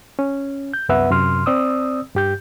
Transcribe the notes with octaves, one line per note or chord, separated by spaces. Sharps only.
C#4
G6
C2 F#2 B3 B4 E5 F#5
F#2 C3 C6 F6
C4 D5 D#6 E6
G2 G4 G6